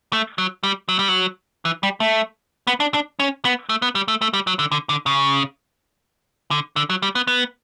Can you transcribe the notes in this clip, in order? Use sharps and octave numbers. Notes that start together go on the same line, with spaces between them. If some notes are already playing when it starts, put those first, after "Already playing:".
A3
F#3
G3
F#3
G3
F#3
E3
G3
A3
B3
D4
D4
C#4
B3
A3
B3
G3
A3
A3
G3
F#3
D3
D3
D3
C#3
D3
D3
F#3
G3
B3
B3